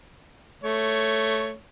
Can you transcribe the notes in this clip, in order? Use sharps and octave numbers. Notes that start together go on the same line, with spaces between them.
A3 C#5